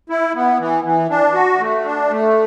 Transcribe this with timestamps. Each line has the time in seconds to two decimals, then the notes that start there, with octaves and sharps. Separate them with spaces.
0.10 E4
0.35 B3
0.59 E3
0.84 E3
1.10 D4
1.34 F#4
1.59 A3
1.85 D4
2.10 A3